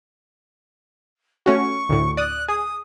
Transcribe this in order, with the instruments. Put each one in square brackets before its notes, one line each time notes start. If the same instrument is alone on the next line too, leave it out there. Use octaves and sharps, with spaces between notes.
[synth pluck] A3 C#4 F#4 [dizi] C#6
[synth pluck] D2 A2
[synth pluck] D5 D#6 [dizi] F#6
[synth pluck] G#4 [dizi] D#6